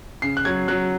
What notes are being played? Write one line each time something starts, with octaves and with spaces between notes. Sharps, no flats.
C#3 C7
F#6
F#3 G#6
F#3 F#6